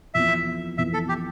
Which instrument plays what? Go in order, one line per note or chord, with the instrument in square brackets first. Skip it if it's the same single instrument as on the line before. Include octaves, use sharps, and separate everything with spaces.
[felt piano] F2 E3 B3 [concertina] E5
[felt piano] F2 E3 B3 [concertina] E5
[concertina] A4
G4